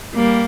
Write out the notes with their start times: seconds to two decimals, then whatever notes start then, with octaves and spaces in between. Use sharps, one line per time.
0.14 G3 A#3